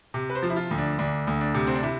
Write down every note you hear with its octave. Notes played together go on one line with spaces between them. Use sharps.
C3
B4
C5
F3
E4
F4
D2
D4
D2 D4
D2
D4
C3
C4
D4
C3 E4